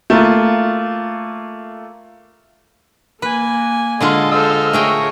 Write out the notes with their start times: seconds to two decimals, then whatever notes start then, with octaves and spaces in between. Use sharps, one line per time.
0.10 A3 A#3 F4
3.22 A#3 B4 G#5
4.01 D3 G#3 F4 A4 D#5
4.31 A4 C5 D#5 E6 F6
4.73 A3 G#4 A#4 C#5 G5